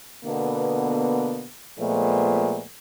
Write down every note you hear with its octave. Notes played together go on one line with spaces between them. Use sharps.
B2 D3 A#3 B3
A#2 F3 G#3 A3 B3